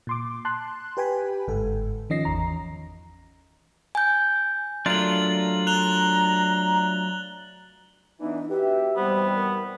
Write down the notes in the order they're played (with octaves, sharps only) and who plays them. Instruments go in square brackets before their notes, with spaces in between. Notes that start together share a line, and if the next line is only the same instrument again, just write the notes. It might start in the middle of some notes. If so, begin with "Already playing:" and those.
[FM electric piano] A#2 C6 D6
A5 C6 F#6
G4 B4 G5 G#5 B5
G1 G#2 A4
D#3 F3 C#4 D#5 A#6 C7
G#1 E2 A#5
[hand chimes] G#5 G6
[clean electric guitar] F#3 A3 [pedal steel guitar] D4 F4 A#4 [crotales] A6 F#7
[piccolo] A#5 [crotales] F#6 F7 G7
[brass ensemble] E3 [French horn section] B3 D4 [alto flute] D#4
[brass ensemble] F#4 E5 [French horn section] G4 [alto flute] B4
[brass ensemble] B2 E3 C4 [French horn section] G3 [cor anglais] B3 [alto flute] C5
[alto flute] A#4